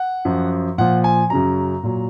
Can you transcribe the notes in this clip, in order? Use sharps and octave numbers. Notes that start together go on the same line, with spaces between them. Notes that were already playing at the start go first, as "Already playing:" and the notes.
Already playing: F#5
F#2 F3
A#2 F3 F#5
G#5
F#2 C#3 F#3 A#5
A#2 F#3